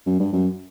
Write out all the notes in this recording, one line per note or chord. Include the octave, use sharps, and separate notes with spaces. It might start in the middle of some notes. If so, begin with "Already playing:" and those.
F#2
G2
F#2